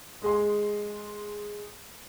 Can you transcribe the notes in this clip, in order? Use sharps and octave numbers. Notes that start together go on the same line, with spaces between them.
G#3 G#4 C6